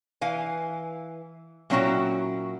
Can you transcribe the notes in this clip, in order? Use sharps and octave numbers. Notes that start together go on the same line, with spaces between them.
E3 F5 G#5
A#2 F#3 C#4 E4 F#4 G5